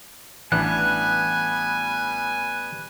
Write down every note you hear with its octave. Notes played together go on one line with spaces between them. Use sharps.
A1 E3 G3 B3 D4 G#5 F#6